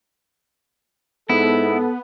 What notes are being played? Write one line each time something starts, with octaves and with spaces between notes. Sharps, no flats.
G#2 B3 E4 A4